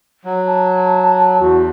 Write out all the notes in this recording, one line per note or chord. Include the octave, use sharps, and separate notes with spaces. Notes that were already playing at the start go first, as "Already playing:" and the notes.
F#3
A5
E2 F#4